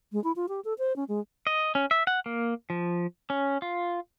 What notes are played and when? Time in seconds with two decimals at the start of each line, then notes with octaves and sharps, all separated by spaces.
0.12 G#3
0.24 E4
0.36 F4
0.49 G4
0.65 A4
0.78 C5
0.96 C#4
1.08 G#3
1.47 D#5
1.75 C#4
1.91 E5
2.07 F#5
2.26 A#3
2.70 F3
3.30 C#4
3.62 F4